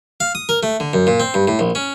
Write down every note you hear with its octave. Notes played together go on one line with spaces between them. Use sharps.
F5
D#6
A#4
A3
D3
F#2
A#2
C4
G2
A2
A#1
C#4